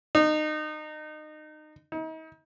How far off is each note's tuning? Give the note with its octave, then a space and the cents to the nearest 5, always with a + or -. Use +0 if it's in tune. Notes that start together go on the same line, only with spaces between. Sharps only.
D#4 -25
D#4 +40